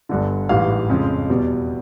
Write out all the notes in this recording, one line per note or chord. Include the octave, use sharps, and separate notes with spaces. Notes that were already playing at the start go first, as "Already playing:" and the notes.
G1 G2 D3
A1 G#2 E3 G3 F5
F2 C#3 F3 G#3
E2 B2 G3